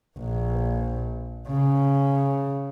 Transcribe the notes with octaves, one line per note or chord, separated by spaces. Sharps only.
A#1
C#3